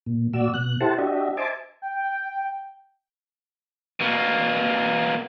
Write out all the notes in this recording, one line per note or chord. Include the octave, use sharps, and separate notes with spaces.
A#2
A#2 F#4 D5 E6
B2 F#6
E4 G4 A4 C5 F#5 A5
D4 F#4 G4 D#5 E5
C5 D#5 E5 G#5 A5 D6
G5
B2 A#3